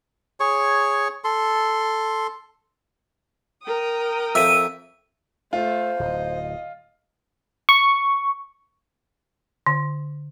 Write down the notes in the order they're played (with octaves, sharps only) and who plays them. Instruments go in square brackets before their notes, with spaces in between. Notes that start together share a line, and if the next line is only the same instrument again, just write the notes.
[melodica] G#4 C#5 C#6
A4 C6
[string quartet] A#4 G5 D#6
[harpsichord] F2 E5 [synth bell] E6 D#7
[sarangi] A3 [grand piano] F4 [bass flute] C5
[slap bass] D1 [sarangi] D#5
[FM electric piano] C#6
[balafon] D3